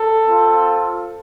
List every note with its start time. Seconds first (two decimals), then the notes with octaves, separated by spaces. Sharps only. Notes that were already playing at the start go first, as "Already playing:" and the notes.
Already playing: A4
0.26 C4 F4